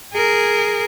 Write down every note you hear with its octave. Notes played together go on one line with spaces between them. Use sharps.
G#4 A#4